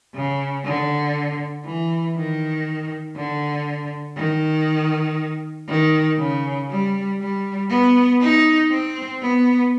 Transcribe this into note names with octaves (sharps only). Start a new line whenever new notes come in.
C#3
D3
E3
D#3
D3
D#3
D#3
C#3
G3
G3
B3
D#4
C4
B3